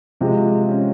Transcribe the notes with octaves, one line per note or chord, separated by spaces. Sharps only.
C3 F3 G#3 C4
C#4